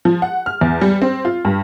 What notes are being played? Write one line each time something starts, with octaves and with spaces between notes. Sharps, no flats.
F3
F#5
F6
E2
G3
C4
F4
G2